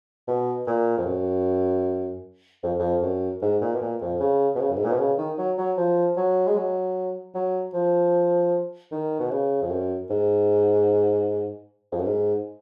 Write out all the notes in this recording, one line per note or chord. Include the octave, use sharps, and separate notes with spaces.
B2
A#2
F2
F#2
F2
F2
F#2
G#2
A#2
B2
A#2
F2
C#3
B2
C#3
F#2
G#2
A#2
B2
C#3
D#3
F#3
F#3
F3
F#3
G#3
F#3
F#3
F3
D#3
B2
C#3
F2
F#2
G#2
F2
F#2
G#2